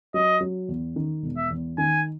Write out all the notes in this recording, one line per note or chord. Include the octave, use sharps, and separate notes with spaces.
F#3 D#5
F#3
E2
D#3
E1
E5
E2
D#3 G#5